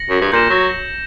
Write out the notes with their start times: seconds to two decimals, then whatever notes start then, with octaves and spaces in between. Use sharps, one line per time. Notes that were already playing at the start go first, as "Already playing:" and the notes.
Already playing: A#6 C#7 F#7
0.10 F#2
0.21 G2
0.32 A#2 G6 A#6 E7 G7
0.50 F#3